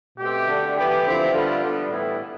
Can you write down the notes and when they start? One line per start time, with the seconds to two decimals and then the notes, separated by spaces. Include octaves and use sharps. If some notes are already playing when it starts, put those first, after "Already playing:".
0.18 B2 A3 C4 G4
0.48 D3 A3 D4
0.76 E3 B3 E4 G4
1.05 D3 F3 C4 E4
1.33 D3 G3 B3 D4 F4
1.62 D3 G3 B3
1.90 A2 E3 G3 B3 E4